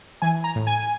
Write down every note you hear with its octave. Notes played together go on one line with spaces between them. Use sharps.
E3 G#5
A#5
A2
G#5